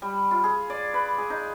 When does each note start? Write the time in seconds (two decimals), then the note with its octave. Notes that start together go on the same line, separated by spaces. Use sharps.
0.02 G3
0.31 F4
0.44 G#4
0.70 D5
0.94 B4
1.18 G#4
1.30 D#4